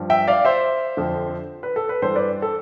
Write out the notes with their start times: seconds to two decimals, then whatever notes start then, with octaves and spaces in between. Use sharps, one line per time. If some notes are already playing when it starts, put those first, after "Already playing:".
Already playing: G2 F3
0.10 E5 G5
0.28 D5 F5
0.45 C5 E5
0.97 F2 D3 F3
1.63 B4
1.76 A4
1.89 B4
2.02 G2 E3 A4 C5
2.16 B4 D5
2.42 A4